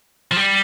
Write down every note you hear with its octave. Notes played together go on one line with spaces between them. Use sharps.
F3
G3